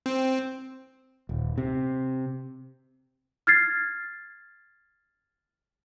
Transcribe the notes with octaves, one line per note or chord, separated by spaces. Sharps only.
C4
D#1
C3
F6 G#6 A6 C7